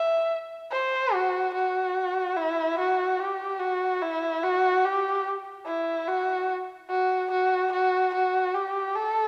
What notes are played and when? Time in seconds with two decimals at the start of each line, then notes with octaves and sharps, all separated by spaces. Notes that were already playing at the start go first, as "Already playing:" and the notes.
Already playing: E5
0.71 C5
1.13 F#4
1.54 F#4
2.36 E4
2.78 F#4
3.19 G4
3.60 F#4
4.02 E4
4.43 F#4
4.84 G4
5.66 E4
6.08 F#4
6.90 F#4
7.31 F#4
7.72 F#4
8.14 F#4
8.55 G4
8.96 A4